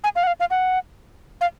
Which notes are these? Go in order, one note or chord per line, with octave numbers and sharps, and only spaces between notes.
G#5
F5
F#5
F5
F5
F#5
F5